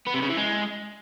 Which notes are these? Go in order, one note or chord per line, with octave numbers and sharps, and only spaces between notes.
B3
C3
C#3
E3
G#3